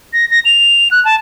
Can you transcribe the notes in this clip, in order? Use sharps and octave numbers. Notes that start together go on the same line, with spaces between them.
A#6
A#6
F7
F#6
A5